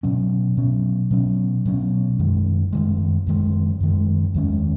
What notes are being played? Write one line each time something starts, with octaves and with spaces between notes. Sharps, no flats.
B2 F#3 C#4
B2 F#3 C#4
B2 F#3 C#4
B2 F#3 C#4
F#2 D#3 G#3
F#2 D#3 G#3
F#2 D#3 G#3
F#2 D#3 G#3
E2 D#3 G#3 C#4